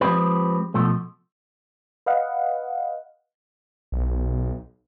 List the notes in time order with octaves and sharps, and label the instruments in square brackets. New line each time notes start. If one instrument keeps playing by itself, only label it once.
[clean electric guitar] F3 G#3 C4 G4 B4
B2 F3 A3
[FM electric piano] B4 D#5 F5 F#5
[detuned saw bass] B1